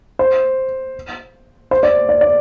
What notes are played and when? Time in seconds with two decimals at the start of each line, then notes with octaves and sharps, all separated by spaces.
0.19 C5
1.71 C5
1.83 D5
2.09 D5
2.21 D5